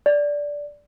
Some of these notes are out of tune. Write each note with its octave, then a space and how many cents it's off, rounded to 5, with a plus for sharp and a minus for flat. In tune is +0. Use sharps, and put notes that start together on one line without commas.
D5 -10